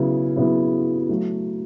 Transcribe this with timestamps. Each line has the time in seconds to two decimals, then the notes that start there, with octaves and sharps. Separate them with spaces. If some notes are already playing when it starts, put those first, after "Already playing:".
Already playing: C#3 F#3 B3 E4
0.36 C#3 F#3 B3 E4
1.09 F#3 A3 F#4